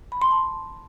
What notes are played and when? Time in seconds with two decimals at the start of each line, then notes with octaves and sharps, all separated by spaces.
0.12 B5
0.22 C6
0.31 A5